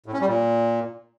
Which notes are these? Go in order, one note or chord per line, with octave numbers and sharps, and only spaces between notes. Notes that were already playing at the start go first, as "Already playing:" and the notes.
A2
C#4
G3
A#2